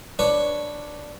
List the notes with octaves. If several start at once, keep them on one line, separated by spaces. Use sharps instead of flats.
D4 B4 C#5